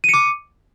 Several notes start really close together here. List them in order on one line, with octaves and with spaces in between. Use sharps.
D#7 C#7 D6